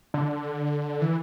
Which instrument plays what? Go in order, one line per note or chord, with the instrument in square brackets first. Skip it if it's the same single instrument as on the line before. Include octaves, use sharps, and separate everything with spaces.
[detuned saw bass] D3
E3